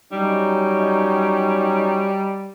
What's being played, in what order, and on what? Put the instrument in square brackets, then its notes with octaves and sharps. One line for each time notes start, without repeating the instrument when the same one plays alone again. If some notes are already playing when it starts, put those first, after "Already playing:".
[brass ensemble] F#3 C#4 D#4 [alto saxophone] G3